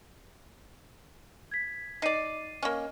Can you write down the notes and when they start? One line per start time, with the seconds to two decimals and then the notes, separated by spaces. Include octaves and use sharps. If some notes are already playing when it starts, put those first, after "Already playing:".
1.51 G#6 B6
2.02 D#4 D5 C7 D#7
2.63 A#3 C#4 D#5